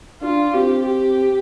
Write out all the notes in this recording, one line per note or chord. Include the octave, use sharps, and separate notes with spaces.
D4 F4
C4 G4
G4